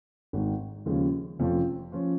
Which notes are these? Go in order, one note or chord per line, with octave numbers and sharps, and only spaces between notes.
G#1 G#2 D#3
D#2 C#3 F3 G#3 C#4
F1 F2 F3 C#4 F4
F3 C#4 F4